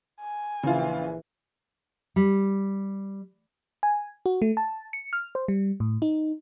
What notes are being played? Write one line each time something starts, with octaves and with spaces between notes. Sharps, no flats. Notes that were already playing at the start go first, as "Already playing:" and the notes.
G#5
A#1 C#3 E3 F4
G3
G#5
F#4
A3
A5
C#7
F6
C5
G3
A2
D#4